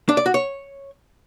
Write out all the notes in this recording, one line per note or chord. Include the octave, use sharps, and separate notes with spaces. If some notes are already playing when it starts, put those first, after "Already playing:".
D4
D5
F#4
C#5